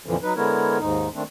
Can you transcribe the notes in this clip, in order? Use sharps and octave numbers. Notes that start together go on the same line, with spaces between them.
F2 A#2 D3 E3 F3
F#3 D#4 B4
D3 G#3 B3 E4 A#4 C#5
D#2 G#2 D#4
D#3 A3 C4 D4